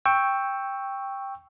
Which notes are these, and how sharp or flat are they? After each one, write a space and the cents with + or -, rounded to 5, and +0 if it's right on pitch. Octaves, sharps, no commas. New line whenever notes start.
G5 +10 C#6 +0 E6 +0